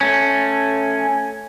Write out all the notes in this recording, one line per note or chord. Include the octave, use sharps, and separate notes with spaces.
A3 C#4